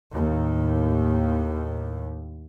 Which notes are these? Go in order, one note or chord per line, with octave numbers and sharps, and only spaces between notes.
D#2 A2